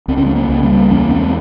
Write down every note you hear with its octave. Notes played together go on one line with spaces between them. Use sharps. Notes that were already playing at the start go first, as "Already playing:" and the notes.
C#2 C4
C#4
G#3 C4
A#3 C#4
C#2
G3 A#3
E2 A#3 C#4
G#3 C4